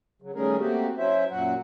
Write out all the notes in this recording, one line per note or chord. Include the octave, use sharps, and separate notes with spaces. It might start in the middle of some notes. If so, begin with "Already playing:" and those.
C#3 F#3
D#3 G3 A3 C#4 G#4 A#4
A3 A#3 C4 F#4 G4
F#3 C#4 E4 C5 E5
F#2 A#2 F#3 F#4 F#5